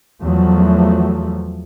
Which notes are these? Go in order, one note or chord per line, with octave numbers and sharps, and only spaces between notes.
E2 F3 F#3 A3